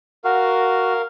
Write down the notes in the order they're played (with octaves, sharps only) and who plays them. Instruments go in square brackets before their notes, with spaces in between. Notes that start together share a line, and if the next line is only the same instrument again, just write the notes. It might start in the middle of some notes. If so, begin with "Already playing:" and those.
[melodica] F#4 [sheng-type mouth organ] A#4 F5